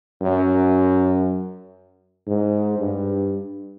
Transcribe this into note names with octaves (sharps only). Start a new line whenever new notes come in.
F#2
G#2
G2